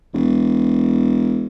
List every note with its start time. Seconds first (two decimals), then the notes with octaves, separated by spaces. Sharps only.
0.13 E1